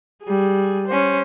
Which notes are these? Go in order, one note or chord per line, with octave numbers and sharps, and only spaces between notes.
G3 G#4
C#4 C5